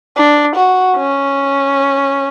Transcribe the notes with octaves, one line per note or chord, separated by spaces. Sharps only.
D4
F#4
C#4